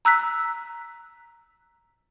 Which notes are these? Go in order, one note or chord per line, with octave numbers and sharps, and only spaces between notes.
A#5 E6 F#6 B6